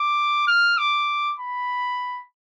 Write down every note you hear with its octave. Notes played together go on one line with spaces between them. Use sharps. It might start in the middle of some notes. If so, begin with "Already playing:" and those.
Already playing: D6
F6
D6
B5